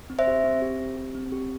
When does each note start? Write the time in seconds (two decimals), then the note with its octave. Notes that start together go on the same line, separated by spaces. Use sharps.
0.10 C4
0.19 C5 E5
0.27 G4
0.44 C4
0.62 G4
0.80 C4
0.96 G4
1.15 C4
1.32 G4